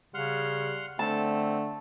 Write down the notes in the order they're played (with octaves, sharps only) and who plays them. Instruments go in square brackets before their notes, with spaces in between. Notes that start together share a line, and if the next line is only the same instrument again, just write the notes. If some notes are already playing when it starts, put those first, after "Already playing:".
[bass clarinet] C#3 [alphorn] G3 [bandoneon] F#5 C6 F6
[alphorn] D3 [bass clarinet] A3 [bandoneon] C4 [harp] A5